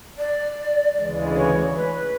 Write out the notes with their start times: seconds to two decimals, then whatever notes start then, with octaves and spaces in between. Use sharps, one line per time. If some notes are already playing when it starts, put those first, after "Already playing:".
0.18 D5
0.96 D2 C#3 E3 G#3 D5
1.36 C#5
1.75 B4